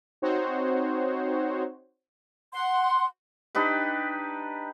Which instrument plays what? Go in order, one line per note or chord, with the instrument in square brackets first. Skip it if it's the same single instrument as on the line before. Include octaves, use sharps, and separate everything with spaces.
[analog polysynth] C4 D#4 F#4 C5 C#5
[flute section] F#5 C6
[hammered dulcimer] D4 D#4 G4 B4